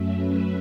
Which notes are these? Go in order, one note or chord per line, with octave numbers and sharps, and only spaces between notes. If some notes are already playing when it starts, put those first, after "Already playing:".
Already playing: F#2 F#3 A3 C#4 E5
B4